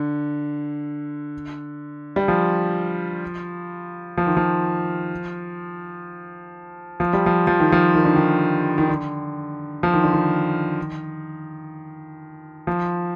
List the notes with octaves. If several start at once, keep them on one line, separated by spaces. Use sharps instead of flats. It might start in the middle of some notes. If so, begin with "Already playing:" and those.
Already playing: D3
G3
F3
F3
D#3
F3
F3
G3
F3
F3
D#3
F3
D#3
D3
D#3
D#3
D3
F3
D#3
D3
D#3
F3